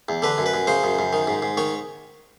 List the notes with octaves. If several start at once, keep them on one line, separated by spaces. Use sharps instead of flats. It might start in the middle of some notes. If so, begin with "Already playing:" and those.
E2
D3 B4
F#2
B4
F#2
C#3 C5
F#2
F#2
D#3
G#2
G#2
D#3 C#5